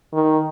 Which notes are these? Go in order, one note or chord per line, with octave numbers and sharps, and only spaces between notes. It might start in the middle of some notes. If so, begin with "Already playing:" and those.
D#3